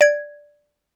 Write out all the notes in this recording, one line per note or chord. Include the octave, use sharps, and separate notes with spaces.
D5 G#6